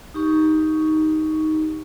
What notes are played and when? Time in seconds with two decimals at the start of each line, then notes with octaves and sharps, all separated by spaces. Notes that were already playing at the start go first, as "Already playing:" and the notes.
0.14 D#4 G4 C#6